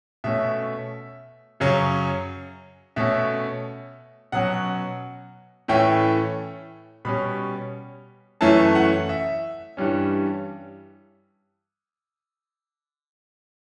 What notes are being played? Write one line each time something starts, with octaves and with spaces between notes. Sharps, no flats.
B2 A3 C#4 E5
F#2 C#3 F#3 C#4
B2 A3 C#4 E5
B2 F#3 C#4 F#5
A2 E3 A3 C#4 G5
B2 G3 C#4 B5
F#2 E3 A3 C#4 A5
F#5
E5
G2 E3 G3 C#4